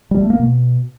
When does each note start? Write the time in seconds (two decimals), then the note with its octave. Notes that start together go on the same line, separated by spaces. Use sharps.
0.11 G3
0.21 A3
0.30 A#3
0.39 B2